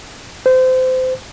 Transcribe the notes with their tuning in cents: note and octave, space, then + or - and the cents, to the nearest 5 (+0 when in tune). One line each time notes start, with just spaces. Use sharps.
C5 -25